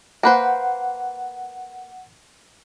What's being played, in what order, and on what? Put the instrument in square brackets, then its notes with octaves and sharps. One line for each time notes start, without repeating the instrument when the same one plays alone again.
[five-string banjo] A#3 B4 C5 [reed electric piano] F#5